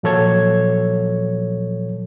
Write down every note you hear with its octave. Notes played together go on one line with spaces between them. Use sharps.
A#2 F3 F#3 A4 C#5 G#6